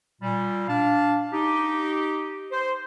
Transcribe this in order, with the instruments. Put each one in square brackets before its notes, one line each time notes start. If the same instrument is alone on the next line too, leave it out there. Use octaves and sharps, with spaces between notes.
[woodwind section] A#2 G3
D4 F5 A5
D#4 G4
C5